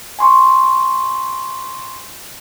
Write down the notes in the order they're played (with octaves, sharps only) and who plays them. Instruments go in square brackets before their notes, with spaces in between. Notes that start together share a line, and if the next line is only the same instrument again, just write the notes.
[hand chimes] G#5 C6 C#6